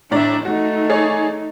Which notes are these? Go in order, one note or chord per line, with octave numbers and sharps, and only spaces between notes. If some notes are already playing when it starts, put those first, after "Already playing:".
A2 D4 D5 E5 A#5
A3 D#4 F#4
G#4 C#5 D5